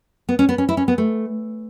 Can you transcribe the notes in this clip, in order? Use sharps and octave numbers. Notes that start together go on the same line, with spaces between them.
B3
C#4
B3
C#4
E4
C#4
B3
A3